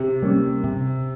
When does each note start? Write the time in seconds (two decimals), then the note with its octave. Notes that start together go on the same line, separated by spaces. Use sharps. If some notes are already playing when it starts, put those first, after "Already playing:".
Already playing: C3
0.22 G3 A#3 C#4
0.64 C3